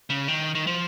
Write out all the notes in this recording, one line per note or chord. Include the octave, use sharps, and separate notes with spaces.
C#3
D#3
D#3
F3